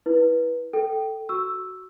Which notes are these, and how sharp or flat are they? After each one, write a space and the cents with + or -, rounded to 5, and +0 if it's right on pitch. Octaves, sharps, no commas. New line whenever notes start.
E4 -10 B4 -20
A4 +0 G5 -15
F#4 +10 C#6 +5 E6 +0